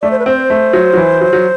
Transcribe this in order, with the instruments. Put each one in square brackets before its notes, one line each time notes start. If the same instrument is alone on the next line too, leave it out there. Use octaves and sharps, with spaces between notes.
[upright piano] A3 [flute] D5
[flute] C5
B4
[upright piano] C4 [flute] C5
[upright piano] A3
F#3
F#3
E3
F#3
F#3